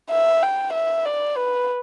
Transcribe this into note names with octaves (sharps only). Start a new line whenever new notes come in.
E5
G5
E5
D5
B4